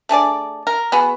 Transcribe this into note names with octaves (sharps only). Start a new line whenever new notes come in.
A3 D4 G#4 D5
A#4
B3 F#4 G#4